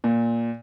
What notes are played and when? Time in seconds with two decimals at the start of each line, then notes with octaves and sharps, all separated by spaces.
0.04 A#2